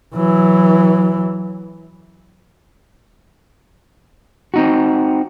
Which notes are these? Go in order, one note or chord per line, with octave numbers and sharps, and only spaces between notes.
E3 F#3
C4 D#4 F#4